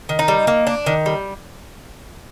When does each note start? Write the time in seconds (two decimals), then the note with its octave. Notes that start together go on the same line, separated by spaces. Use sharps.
0.09 D#3
0.19 D#4
0.28 G3
0.47 A#3
0.67 D4
0.86 D#3
1.06 G3